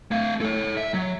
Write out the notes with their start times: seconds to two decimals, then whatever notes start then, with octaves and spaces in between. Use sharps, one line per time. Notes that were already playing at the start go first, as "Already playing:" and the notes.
0.11 A3 F5
0.41 A4 C#5
0.77 E5
0.94 F#3